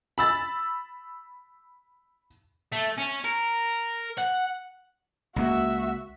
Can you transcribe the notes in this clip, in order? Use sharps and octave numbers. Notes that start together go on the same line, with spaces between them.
B5 E6 A6
A3
C#4
A#4
F#5
C#2 A#3 F#4 E5